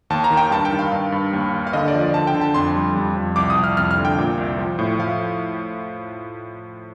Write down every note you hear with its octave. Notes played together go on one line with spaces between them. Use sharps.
D#2 A5
A#5
D#3
G5
G2 A5
G5
D#3
F5
G2
G2
D#2
D#2
F5
D3 D#5
D5
F3
D5
D3 A5
G5
D3
A5
F2 C6
G3
F2
F2
C2 D6
D#6
C2
F6
F2 F6
F6
D3
G5
A#2
C2
F3
A2
F3 F5